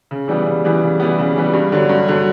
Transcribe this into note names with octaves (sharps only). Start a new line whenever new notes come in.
C#3
E3 G3 B3
C#3
E3 G3 B3
C#3
E3 G3 B3
C#3
E3 G3 B3
G2
D3 F#3
G2
D3 F#3